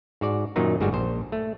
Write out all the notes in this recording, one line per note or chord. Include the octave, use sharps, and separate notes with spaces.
G#2 F#4 D5
F#2 A#2 D#3 F#3 D#4
G1 G#2 G3 G#3 F#4
A#1 C5
A3